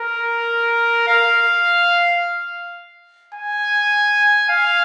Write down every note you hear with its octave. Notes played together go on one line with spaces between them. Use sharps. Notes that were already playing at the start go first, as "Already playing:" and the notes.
Already playing: A#4
F5
G#5
F5